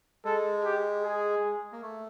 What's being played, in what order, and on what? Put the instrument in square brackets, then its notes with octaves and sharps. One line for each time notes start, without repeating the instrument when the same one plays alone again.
[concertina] G#3 [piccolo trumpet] A4
[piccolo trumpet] G4
G#4
[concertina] A#3
A3